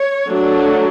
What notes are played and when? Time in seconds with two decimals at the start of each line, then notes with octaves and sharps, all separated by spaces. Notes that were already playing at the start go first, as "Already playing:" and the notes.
Already playing: C#5
0.27 F#3 A3 D4